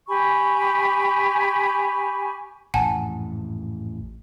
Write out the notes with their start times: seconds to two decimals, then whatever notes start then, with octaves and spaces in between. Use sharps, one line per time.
0.08 G4 G#5 B5 C#6
2.74 A1 F2 G#2 F#5 G#5 A5